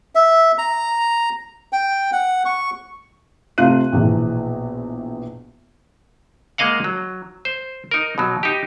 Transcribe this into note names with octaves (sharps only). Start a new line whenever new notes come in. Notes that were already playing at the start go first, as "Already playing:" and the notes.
E5
A#5
G5
F#5
C#6
C3 A3 F4 F5 F#6 D#7
A#1 E2 B2 E3
G#3 A#3 D#5 F5 F#5
F#3
C5
D#4 A#4
B2 F#3
D#4 G4